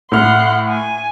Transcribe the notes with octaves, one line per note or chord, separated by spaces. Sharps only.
A2 F#5 C6 F6
G#5